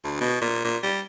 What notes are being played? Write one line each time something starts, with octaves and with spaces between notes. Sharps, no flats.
D2
B2
A#2
A#2
G3